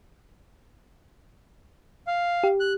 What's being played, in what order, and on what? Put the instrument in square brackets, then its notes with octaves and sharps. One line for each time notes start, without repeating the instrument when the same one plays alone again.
[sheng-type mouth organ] F5
[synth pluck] G4
[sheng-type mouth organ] F#6